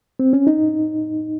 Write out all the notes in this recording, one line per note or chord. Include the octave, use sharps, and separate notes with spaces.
C4
C#4
D#4